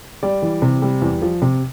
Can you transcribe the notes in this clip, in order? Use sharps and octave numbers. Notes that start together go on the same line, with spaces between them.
G3 D5
E3
C3
G3
E2
F3
C3